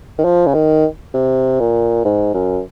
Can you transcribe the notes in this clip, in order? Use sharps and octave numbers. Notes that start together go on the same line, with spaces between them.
D#3
F3
C#3
D#3
C3
A#2
G#2
F#2